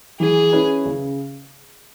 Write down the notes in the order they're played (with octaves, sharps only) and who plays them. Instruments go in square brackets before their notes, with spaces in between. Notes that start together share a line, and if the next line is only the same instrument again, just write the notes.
[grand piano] E3 [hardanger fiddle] G#4
[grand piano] C#4 E4 B4
C#3